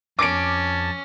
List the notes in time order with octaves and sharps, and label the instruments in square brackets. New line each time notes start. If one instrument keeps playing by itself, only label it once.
[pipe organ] F2 A5 [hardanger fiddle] C#4 [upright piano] D6 D7